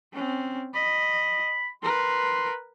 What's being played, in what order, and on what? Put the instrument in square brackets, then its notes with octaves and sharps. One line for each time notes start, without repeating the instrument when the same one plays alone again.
[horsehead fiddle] C4 C#4
[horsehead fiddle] D#5 [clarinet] B5
[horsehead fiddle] A#4 B4 [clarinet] C6